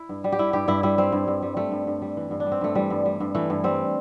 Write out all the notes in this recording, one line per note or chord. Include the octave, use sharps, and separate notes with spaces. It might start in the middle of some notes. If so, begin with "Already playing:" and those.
Already playing: E4
G2
G3
G4
G3 E4
G2 G4
G2 E4
G3 E4
G3 C4
G2
G2
G3
G3 A3
G2
G2
G3
E3
G2
D4
G3
C4
G2 A3
E3 G3
G2
G3
G2
E3 A3
G2
G3 C4